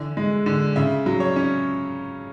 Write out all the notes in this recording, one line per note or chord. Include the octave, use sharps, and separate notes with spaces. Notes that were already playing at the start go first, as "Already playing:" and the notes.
Already playing: D3 E3
G#3
D3
C#3 E5
F#3
C#5
C#4